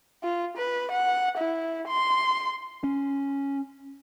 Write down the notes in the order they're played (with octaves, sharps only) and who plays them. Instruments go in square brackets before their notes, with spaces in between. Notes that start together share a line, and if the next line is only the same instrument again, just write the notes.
[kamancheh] F4
B4
F#5
E4
C6
[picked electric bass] C#4